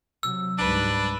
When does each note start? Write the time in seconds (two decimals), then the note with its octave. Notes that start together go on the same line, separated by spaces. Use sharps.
0.23 C3 F#3 E6
0.58 C#2 G#2 G3 D4 B4